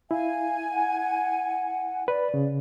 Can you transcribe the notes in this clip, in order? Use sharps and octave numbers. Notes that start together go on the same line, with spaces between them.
E4 F5 G#5
F#5
B4 D5
C#3